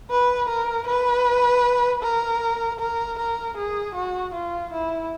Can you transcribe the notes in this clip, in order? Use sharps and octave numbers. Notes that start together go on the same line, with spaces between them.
B4
A#4
B4
A#4
A#4
A#4
G#4
F#4
F4
E4